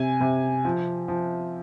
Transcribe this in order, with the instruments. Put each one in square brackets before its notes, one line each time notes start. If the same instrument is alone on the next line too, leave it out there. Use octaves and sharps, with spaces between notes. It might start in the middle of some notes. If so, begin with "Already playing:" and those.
Already playing: [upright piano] C3 G#5
C3
F3
F3